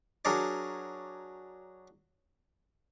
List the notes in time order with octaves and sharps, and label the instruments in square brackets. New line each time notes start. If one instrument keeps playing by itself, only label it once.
[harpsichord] F#3 D4 G#4 A#4 C#5 D5